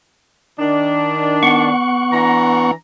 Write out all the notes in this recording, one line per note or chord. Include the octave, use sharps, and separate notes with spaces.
D#3 D4
B3 F#5 C#6
E3 D4 A#5